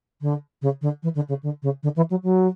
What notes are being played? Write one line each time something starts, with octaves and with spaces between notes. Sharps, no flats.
D3
C#3
D3
E3
D3
C#3
D3
C#3
D3
E3
F#3
F#3